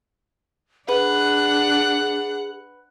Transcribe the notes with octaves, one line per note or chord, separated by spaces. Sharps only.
D4 G#4 B4 F#5